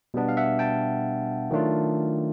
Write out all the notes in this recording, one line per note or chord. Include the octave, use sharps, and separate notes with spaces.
B2 G3 B3 D4
F5
E5 F#5
G5 A5
D#3 F#3 A3 D4 F4